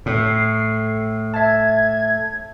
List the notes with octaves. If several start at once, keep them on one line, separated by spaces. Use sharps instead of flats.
A2 C7
E5 A5 G#6